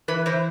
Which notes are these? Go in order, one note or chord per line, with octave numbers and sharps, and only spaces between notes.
E3 B4
E3 C5